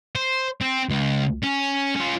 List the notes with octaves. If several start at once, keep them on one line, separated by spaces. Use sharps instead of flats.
C5
C4
C#2
C#4
C#4 F4